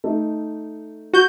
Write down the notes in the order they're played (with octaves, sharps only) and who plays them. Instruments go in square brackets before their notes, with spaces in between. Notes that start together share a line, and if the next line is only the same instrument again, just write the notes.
[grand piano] A3 D#4
[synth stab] F#4 G6